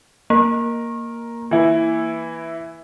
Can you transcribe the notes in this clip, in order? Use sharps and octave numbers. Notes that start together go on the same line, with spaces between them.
A#3 A#4
E3 E4